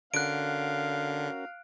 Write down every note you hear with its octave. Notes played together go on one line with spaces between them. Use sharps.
D3 C#4 F#4 A#4 F5 F#6 D7